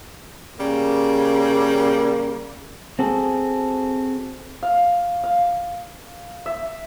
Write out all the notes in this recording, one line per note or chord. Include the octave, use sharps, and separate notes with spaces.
C#3 G3 A#3
C4 F#4 G#4 A4
F5
F5
E5